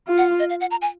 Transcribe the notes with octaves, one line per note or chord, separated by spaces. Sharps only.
F4
F#5
D#5
F5
F#5
A#5
G#5